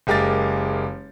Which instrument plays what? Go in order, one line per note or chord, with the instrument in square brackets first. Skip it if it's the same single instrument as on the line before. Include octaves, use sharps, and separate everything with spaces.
[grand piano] F#1 G#3 G4 A#4 F5 A6